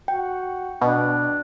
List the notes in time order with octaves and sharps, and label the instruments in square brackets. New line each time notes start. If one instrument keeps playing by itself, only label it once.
[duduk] F#4 [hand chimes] G5
[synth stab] B2 [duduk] D4